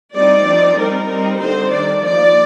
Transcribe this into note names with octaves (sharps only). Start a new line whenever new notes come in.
G3 C4 D#4 D5
F3 C4 D#4
G3 C4 D#4 A#4
G3 C4 D#4
D3 G3 C4 D#4 C5
D#3 G3 D4 D5
F3 A#3 D#4 D5